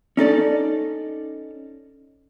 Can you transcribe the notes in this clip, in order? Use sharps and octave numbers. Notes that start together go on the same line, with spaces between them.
C#4 D#4 A4 D5